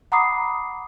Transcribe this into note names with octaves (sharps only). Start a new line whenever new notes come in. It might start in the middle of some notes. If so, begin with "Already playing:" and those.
F#5 A#5 B5 D6 D#6 C7